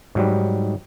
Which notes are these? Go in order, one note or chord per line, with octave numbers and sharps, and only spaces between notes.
G#2 F#3 G3